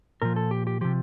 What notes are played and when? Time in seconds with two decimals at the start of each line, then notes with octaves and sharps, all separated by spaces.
0.22 A#2 F3 A#4
0.36 A4
0.51 G4
0.67 G4
0.81 C3 F3 G4